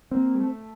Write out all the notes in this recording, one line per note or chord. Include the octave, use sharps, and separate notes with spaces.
A#3 C4
G3
A3